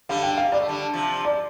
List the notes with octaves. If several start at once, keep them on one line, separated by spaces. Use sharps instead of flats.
D3 G3 F5
G5
F5
G3 D5
A3
D3 G3
C3 F3
D5